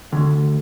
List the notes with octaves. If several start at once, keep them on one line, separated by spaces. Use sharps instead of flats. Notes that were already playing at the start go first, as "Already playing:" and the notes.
D2